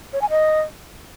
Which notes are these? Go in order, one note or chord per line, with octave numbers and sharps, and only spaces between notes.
C#5
G#5
D#5